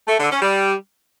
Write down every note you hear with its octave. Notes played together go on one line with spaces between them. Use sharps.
A3
D3
C#4
G3